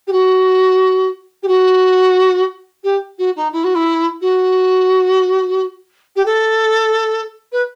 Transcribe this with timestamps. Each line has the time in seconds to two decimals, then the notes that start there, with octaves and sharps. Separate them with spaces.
0.07 G4
0.12 F#4
1.43 G4
1.48 F#4
2.84 G4
3.19 F#4
3.36 D#4
3.53 E4
3.64 F#4
3.75 E4
4.21 F#4
6.16 G4
6.26 A4
7.52 B4